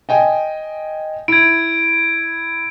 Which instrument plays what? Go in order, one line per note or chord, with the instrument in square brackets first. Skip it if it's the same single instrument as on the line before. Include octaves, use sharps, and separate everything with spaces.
[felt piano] D#5 G5 G#5
[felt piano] E4 [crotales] G#6 D7